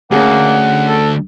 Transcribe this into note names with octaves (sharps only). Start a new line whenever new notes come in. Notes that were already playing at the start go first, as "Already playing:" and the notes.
D2 A#3 C#4 G#4 F#5
A4